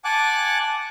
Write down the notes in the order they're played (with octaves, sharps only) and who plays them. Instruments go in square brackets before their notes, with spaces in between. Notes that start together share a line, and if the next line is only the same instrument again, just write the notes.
[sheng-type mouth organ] F#5 G#5 A5 D6 F#6